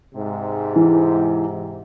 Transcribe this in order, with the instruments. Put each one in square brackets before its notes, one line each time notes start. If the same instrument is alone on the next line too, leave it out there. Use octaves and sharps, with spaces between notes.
[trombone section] G#2 C3
[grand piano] E3